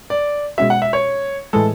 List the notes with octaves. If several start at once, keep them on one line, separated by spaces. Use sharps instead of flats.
D5
B2 G#3 C#4 F#4 E5
F#5
E5
C#5
A2 E3 G#3 A4